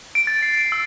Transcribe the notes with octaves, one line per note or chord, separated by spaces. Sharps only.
D7
A6
C7
D7
E6